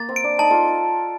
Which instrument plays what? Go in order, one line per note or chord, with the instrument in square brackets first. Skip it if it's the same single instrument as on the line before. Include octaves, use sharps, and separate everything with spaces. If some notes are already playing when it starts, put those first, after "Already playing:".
Already playing: [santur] A#3 [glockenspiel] A6
[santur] C4
[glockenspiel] D7
[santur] D4
[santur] D#4 [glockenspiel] A5
[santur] F4 A4